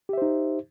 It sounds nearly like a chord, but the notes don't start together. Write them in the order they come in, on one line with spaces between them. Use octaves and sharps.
G4 E5 C5 D#4